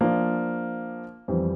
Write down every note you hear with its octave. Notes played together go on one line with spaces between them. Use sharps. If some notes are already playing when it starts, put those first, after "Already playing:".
F3 A#3 D4
F2 E3 G3 C4 G4